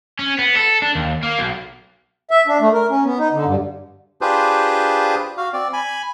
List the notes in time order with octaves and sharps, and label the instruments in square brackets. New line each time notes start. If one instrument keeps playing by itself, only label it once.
[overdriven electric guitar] C#4
B3
A4
D4
D#2
A#3
B1
[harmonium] E5
D4
A3
A#4
C#4
B3
D#4
D3
G2
[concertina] D4 F4 G4 G#4 B4 C5
F#4 F5
C4 D5
G#5 B5